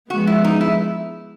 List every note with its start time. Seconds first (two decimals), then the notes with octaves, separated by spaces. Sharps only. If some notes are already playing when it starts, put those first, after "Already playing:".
0.10 F3 G#3 B3 F#4
0.27 E4
0.44 D#4
0.61 E4